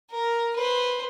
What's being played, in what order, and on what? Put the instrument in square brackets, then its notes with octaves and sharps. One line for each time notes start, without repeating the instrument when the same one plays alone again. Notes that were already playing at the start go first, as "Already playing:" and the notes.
[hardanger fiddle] A#4
B4 C5